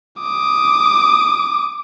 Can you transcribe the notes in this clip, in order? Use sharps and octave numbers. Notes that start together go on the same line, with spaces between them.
D6 D#6